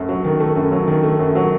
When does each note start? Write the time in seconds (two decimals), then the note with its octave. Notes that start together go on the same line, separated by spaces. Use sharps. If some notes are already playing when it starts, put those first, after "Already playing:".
Already playing: F#2 A3
0.08 F#3
0.24 D#3
0.40 A3
0.56 F#2
0.72 F#3
0.88 D#3
1.03 A3
1.19 F#2
1.35 F#3